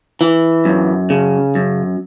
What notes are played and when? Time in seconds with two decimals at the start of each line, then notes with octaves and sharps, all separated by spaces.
0.21 E3
0.65 F#2
1.10 C#3
1.55 F#2